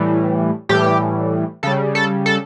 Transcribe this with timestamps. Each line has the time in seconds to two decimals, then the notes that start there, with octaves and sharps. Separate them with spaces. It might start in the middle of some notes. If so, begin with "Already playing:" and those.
Already playing: A2 E3 G3
0.69 A2 E3 G3 G4
1.63 C#3 G3 A4
1.95 A4
2.26 A4